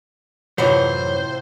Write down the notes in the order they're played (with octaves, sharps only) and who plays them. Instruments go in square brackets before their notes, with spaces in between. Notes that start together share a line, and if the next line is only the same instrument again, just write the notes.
[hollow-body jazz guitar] F#2 E3 F#3 [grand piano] A2 C3 F4 [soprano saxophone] C5